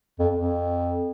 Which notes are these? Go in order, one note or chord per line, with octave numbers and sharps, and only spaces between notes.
F2
F2